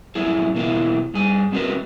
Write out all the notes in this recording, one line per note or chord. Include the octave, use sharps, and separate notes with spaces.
F#2 A2 F3 E4 G#4
B2 E3 A#3 C#4 E4 F4
G2 G#4
G#3 C4 C#4 F#4 A#4 B4